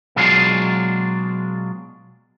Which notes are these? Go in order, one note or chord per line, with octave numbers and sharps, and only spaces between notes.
B2 F#3 G#3 D4 F4 G#4